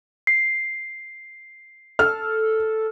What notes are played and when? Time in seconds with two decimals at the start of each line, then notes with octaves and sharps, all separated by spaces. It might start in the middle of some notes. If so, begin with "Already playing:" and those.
0.27 C7
1.99 A4 F6